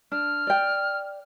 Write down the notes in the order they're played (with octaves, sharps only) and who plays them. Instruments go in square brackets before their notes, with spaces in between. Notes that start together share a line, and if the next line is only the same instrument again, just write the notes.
[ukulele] D4 [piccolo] F6
[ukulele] D5 G5